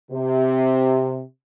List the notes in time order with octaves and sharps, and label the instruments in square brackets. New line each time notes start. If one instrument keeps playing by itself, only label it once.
[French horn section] C3